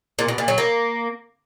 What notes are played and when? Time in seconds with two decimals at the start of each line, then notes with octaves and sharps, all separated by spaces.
0.19 A#2
0.28 B2
0.38 A#2
0.48 F#3
0.58 A#3